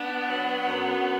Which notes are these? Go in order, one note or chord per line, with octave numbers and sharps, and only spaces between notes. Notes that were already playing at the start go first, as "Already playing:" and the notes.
Already playing: B3 D4
F#3
F#2